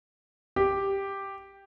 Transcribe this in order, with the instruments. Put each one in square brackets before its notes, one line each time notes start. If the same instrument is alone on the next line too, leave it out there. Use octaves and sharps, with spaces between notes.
[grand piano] G4